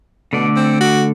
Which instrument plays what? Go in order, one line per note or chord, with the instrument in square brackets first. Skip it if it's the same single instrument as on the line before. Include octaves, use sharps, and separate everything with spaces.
[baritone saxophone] B2 [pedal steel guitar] D3 A3 D5
[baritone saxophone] C4
F#4